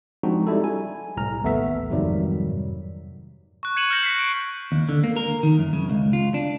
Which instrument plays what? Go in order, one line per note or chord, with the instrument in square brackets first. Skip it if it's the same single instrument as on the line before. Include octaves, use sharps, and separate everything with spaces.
[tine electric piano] F3 G#3 C4 D4 D#4 F#4
G3 D#4 E4 A4
G#5
C2 A2 A#5 F6
A1 D#2 A3 B3 E5 B6
F2 G#2 C3 D#3 F#3 G3
[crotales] C#6 F#6
G#6 C#7 D#7 E7 F#7
F6 G6 A#6 C#7 F#7
F#6 B6 C7
D7
[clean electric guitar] D#2
D3
A#3
A#4
D#3
F#2
C#3
C#2
F4
D4